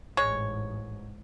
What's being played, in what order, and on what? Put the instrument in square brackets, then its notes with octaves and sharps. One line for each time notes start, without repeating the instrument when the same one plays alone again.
[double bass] A1 G#2 [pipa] G#3 C#5